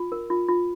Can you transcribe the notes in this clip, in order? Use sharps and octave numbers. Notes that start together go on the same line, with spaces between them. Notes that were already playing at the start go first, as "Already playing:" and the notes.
Already playing: F4
A#4
F4
F4